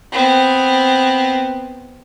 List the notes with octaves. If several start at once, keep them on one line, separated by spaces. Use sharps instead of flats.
B3 C4